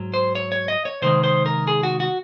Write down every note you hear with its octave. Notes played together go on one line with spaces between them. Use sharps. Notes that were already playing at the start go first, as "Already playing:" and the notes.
Already playing: G#2 F#3
C5
C#5
C#5
D#5
C#5
C3 D#3 G#3 C5
C5
A#4
G#4
F#4
F#4